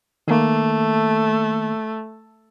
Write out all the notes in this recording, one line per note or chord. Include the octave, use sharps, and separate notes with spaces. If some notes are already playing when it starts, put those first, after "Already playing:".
D#3 A3 A#3